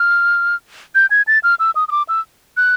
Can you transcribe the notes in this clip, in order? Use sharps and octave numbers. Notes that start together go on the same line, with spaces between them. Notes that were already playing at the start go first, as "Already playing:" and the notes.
Already playing: F6
G6
G#6
A6
F6
E6
D#6
D#6
D6
E6
F#6